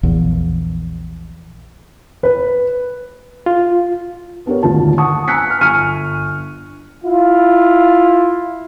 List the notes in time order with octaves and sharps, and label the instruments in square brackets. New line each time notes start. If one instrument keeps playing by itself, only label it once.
[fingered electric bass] A#1 E2
[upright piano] B4
[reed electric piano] F4
[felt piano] B3 D4 G4 A#4 C#5
D#1 G#1 D2 D3 F4 A5
F#5 A5 C#6 D#6
G#5 A#5 E6 F#6 B6 C#7
G#5 F6
G1 G#5 C#6 F6 C#7 D#7
[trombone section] E4 F4